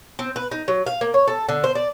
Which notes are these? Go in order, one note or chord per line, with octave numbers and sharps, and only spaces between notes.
C4
B4
D#4
F#3
F5
A#3
C#5
A4
D3
C5
D5